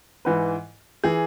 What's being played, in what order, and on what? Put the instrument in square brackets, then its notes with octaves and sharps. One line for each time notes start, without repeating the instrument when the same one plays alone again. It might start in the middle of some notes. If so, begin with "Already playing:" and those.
[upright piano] G#2 E3 B4
E3 G#4